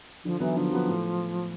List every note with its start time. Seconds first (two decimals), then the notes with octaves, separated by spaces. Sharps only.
0.24 D3 F3
0.40 E3 F#3 B3
0.56 D3 F3
0.72 F#3 B3
0.87 A2